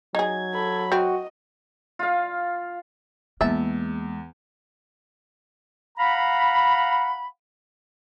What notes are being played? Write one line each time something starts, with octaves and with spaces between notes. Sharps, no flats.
F#3 D#4 G#4 G#6
A4 B5
C4 F#4 D#5
F4 F5
E2 G#3 A#3 E5 A5
F5 F#5 A#5 B5